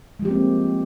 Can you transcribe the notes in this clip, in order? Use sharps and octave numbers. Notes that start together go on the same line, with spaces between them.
F3 G#3 A#3 C4 G4